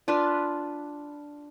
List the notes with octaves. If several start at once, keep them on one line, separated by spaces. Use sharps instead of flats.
D4 F4 B4